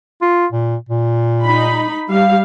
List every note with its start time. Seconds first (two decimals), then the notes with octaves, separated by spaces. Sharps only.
0.21 F4
0.52 A#2
0.89 A#2
1.44 D#4 B5
2.10 G3 F5